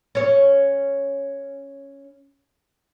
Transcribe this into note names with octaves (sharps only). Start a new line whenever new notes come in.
C#4 C#5